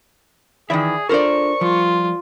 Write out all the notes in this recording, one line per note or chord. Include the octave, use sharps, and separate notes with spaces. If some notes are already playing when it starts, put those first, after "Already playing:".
D#3 E3 G#4 D5 E5
D4 F4 A4 A#4 C5 D5 C#6
F3 G3 F4